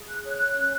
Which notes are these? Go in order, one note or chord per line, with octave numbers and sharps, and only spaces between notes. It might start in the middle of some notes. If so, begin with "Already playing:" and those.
Already playing: G#4
F#6
C#5 F#6
C#4